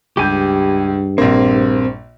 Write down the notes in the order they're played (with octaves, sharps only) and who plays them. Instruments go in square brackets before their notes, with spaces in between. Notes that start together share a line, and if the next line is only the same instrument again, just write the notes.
[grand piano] C#2 [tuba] G2 [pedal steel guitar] G4 G#5 G6
[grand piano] A#1 A#3 [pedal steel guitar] C4